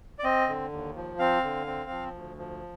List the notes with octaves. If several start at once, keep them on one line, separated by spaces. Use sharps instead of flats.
D5
C4 D#5
D3
D#2
F3
C4 F5
D3
C4
F3
D2
F3